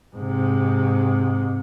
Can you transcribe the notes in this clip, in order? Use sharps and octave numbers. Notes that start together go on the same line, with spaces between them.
G#2 C3